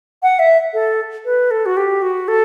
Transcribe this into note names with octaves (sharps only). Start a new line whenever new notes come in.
F#5
E5
A4
B4
A4
F#4
G4
F#4
A4